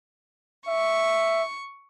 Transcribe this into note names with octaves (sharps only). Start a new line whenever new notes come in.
E5 C#6